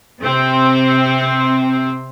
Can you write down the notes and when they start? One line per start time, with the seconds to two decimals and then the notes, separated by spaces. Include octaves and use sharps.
0.20 C3 C4